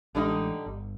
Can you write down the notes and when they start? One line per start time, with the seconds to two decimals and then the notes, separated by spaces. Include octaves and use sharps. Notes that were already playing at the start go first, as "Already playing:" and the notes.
0.15 A1 D3 G3 G#3 D#4
0.66 G1